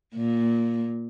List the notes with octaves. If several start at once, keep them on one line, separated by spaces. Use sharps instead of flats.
A#2